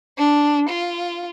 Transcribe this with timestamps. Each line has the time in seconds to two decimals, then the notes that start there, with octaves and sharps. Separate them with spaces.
0.18 D4
0.69 F4